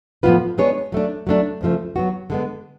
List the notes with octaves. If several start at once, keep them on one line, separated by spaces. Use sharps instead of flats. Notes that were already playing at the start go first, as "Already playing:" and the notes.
A2 F3 B3 F4 B4
G#3 B3 D4 G#4 C#5
F#3 A3 D4
F#3 A3 D4
D2 C#3 F3 A3
F#3 B3 F#4
D3 G#3 B3